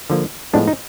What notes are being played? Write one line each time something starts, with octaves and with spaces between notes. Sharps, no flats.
D3 F3 A#3
A2 F3 G#3 B3 D4
D#4